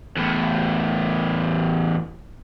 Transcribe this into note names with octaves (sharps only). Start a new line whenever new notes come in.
E2 A2